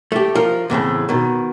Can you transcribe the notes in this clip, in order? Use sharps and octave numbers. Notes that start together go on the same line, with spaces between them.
A3 G4
F3 A#4
E2 A2 C#3 C4
B2 D#3